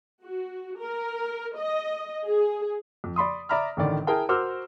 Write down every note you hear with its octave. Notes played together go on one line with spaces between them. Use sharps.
F#4
A#4
D#5
G#4
F2
D5 B5 C6 D#6
D5 E5 A#5 B5 F6
A1 A2 D3 D#3 D5
E4 G#4 A#4 G5 A5
F#4 A#4 C5 D6 E6 F6